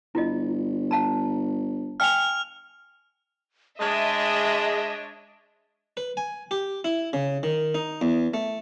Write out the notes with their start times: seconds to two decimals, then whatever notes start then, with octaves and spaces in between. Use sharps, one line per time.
0.15 G1 E4 F4 D#5
0.91 F5 A5 A#5
2.00 F5 G5 G#5 F6 F7
3.80 G#3 D4 C#5 D#5 E5 A5
5.97 B4
6.17 G#5
6.51 G4
6.84 E4
7.13 C#3
7.43 D#3
7.75 D#4
8.01 E2
8.34 A3